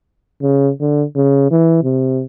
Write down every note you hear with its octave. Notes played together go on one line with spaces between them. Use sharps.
C#3
D3
C#3
E3
C3